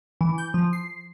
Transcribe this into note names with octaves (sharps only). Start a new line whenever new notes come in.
E3
G6
F3
C7